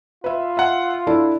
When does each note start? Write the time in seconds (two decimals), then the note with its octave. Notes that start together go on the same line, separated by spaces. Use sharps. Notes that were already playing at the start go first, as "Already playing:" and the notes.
0.24 F4 B4 E5
0.57 E5 F#5
1.07 D4 E4 A4